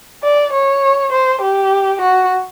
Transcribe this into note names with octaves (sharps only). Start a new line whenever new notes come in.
D5
C#5
C5
G4
F#4